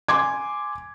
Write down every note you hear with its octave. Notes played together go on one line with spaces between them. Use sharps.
G#5 C6 D6 G#6